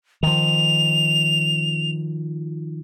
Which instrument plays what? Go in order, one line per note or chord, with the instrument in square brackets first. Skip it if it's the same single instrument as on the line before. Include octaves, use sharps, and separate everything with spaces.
[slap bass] D#3 F3 [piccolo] F7